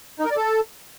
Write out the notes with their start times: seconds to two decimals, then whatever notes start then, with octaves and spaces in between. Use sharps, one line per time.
0.19 D#4
0.25 A#4
0.31 D5
0.37 A4